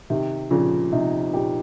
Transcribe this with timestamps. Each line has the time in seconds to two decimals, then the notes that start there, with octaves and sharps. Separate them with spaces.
0.10 C3 D#3 G4
0.51 A#2 C#3 F3
0.92 C3 D#4
1.33 A#2 G4